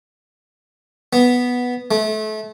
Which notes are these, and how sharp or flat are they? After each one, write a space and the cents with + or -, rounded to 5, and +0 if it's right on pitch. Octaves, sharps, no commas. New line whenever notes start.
B3 -5
A3 -30